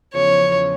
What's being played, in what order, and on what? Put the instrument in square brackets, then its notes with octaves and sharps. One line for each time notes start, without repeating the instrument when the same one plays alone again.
[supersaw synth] E2 C#3 F3 [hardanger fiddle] C#5